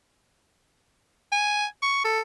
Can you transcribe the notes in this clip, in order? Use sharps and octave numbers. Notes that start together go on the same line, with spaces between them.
G#5
C#6
A4